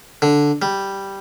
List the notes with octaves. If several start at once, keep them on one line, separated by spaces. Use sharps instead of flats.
D3
G3